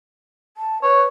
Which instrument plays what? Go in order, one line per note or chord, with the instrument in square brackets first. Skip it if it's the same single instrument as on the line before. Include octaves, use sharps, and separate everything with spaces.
[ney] A5
[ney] B4 [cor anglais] C#5